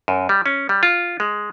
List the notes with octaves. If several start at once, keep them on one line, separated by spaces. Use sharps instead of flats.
F#2
G3
C#4
G3
F4
G#3